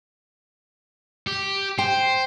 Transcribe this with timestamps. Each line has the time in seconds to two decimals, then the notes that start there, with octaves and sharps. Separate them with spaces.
1.27 G4
1.79 C5 G5